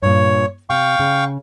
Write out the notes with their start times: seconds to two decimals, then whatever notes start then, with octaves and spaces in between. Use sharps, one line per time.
0.02 G2 A#2 C#5
0.70 C3 F5 G5 C#6
0.99 C#3